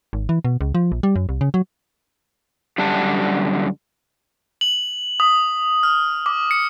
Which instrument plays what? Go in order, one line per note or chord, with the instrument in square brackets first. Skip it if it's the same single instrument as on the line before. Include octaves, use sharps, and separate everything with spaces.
[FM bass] G#1
E3
B2
C#2
F3
A#1
G3
F#2
C2
C#3
F#3
[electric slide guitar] F#2 D3 G3 G4 F#5 A5
[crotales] F#7
D#6
F6
D6
C#7